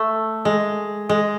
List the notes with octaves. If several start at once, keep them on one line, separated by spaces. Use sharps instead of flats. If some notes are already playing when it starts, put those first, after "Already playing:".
Already playing: A3
G#3
G#3